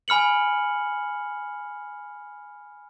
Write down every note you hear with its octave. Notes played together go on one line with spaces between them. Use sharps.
G#5 B5 F6 C#7 F#7